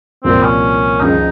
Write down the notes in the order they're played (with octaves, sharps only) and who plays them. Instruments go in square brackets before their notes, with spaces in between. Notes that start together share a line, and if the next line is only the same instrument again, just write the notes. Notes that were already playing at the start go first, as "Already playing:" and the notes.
[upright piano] C2 A#2 F3 A#3 [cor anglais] C4
[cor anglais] C#4
[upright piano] C#2 C#3 F3 [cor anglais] D#4